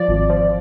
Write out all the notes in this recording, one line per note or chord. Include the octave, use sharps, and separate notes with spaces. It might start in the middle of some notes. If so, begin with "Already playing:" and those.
Already playing: F3 D5
G#1
F3